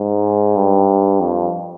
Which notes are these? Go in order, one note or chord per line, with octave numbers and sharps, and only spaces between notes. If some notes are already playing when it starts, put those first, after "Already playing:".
Already playing: G#2
G2
F2